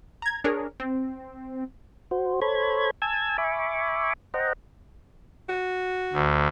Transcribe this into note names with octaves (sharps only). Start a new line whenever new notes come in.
A#5 G#6
D4 G#4 A#4 C#5
C4
F#4 C5
A4 C5 C#5 B5 G#6
G#5 A5 E6 G#6
E5 G#5 B5 C#6 D6
C5 D#5 F#5 G5 A#5
F#4
D2